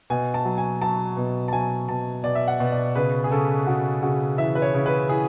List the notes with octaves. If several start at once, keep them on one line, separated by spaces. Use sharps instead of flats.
B2 G#5
A5
F#3
G#5
F#3 A5
B2
A5
F#3 G#5
B2 A5
B2 D5
E5
F#5
B2
D5
C#3 B4
G#4
C#3 A4
C#3 F#4
C#3 F#4
E3 E5
B4
C#5
C#3
B4
E3 G#4